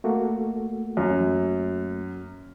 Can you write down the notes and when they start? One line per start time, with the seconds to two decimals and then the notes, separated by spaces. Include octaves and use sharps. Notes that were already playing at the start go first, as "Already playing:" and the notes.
0.04 A3 A#3 F#4
0.97 F#2